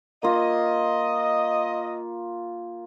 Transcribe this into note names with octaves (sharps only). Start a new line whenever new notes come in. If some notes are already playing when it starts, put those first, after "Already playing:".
A#3 F4 D#5